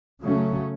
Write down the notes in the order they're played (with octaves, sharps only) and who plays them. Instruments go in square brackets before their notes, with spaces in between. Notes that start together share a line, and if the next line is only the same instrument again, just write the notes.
[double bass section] C#3 F#3 A3 C#4